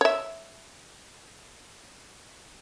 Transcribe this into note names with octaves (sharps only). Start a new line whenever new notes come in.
C#5 E5